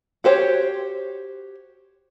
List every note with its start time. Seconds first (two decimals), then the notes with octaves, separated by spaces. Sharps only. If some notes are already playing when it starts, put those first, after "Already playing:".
0.24 F#4 G4 C5 C#5